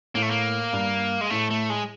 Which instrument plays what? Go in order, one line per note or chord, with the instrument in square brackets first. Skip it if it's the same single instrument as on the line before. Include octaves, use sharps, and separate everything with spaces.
[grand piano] A2 [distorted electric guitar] A#3
[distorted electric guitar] A3
A#3
[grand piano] G2
[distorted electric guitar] G#3
[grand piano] A2 [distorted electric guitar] A3
[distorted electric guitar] A3
G#3